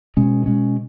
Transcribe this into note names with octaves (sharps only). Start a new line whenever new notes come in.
B2 G#3 C#4
B2 G#3 C#4